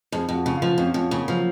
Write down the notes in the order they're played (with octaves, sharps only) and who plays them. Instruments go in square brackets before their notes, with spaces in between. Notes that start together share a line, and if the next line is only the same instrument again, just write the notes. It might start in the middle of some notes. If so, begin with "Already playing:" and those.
[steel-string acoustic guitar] F2 [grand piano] G#4
[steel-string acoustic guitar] F2
[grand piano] F#4
[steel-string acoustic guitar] C#3
[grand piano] F4
[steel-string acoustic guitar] F3
[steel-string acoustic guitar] F2 [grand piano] C#4
[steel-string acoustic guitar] F2 [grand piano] C#4
[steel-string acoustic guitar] C#3 [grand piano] A#3
[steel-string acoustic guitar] F3 [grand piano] F#3